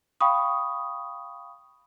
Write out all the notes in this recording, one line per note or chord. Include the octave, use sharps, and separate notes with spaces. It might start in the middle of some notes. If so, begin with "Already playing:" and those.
F5 G5 B5 C#6 D#6